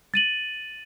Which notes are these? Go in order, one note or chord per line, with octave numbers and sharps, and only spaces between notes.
A6 D#7 F#7